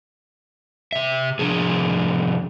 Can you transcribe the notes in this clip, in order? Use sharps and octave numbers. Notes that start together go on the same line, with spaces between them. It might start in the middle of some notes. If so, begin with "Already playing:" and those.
C3 E5
C3 F3 D4 G#4